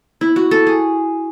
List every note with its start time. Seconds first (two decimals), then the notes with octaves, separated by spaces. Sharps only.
0.21 E4
0.36 F#4
0.51 A4
0.67 G#4